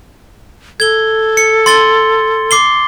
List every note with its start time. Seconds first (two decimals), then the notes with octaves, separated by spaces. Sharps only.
0.80 A4 G#6 G7
1.37 C#7
1.66 C6 A6 G7
2.51 D6 C7 G7